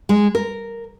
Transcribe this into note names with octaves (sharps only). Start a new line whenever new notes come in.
G#3
A#4